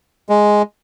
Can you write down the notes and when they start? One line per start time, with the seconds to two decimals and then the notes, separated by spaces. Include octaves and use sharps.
0.29 G#3